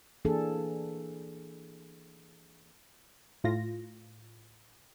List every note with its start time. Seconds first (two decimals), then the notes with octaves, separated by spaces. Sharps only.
0.25 E3 A#3 D4 G#4 A4
3.44 A2 F4 A#6